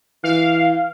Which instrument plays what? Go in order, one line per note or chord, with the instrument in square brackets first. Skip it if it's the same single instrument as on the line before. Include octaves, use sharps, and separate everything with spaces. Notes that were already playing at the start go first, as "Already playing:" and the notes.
[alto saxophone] E3 [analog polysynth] F5